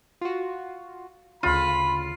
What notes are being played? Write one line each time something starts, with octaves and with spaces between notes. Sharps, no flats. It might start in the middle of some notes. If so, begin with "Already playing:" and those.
F4 F#4
D2 C#3 F4 B5